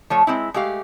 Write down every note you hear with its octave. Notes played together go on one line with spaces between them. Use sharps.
F3 A3 C#5
G#3 C4 E4
G#3 A3 G4 F5